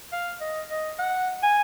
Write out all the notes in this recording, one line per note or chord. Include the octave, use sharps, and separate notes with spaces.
F5
D#5
D#5
F#5
G#5